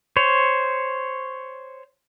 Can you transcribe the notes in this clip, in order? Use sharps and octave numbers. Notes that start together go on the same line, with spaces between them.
C5 C#5